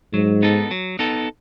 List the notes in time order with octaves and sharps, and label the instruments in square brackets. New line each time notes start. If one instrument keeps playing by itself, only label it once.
[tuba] G#2 [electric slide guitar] F#3
[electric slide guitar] B3 D#4 A4
F#3
B3 D#4 A4